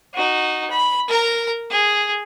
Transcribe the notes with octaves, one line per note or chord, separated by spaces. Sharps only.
D#4 F#4
B5
A#4 A#5
G#4